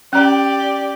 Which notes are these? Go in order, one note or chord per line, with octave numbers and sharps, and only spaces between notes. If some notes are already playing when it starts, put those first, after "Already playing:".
C#4 G4 D5 A#5